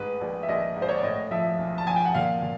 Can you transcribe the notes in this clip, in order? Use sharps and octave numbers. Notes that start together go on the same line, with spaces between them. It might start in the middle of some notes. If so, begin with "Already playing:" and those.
Already playing: A1 G#2 B4
A#1
E5
A#1 D#5
G#2
C5
C#5
D5
A2 D#5
F3 E5
B1
A5
F3 G#5
G5
F#5
A#2 F5
A#2